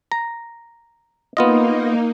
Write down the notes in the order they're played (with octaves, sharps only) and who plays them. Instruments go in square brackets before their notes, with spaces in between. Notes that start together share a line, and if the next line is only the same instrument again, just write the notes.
[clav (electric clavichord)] A#5
[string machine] A#3 D#4 [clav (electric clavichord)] B3 F4 D#5